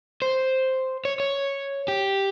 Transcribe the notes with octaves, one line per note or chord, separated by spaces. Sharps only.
C5
C#5
C#5
G4